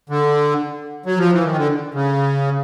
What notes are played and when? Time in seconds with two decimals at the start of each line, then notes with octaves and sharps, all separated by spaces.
0.10 D3
1.06 F#3
1.18 F3
1.32 E3
1.44 D#3
1.57 D3
1.94 C#3